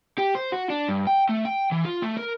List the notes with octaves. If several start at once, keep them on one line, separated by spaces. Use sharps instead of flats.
G4
C5
F#4
D4
G2
G5
A3
G5
E3
F4
A3
A#4